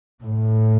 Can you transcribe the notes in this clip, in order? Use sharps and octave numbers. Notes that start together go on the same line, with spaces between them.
A2